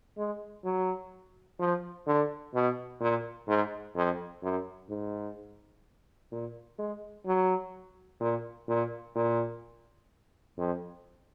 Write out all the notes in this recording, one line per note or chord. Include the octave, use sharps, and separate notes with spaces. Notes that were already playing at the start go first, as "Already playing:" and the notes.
G#3
F#3
F3
D3
B2
A#2
G#2
F2
F#2
G#2
A#2
G#3
F#3
A#2
A#2
A#2
F2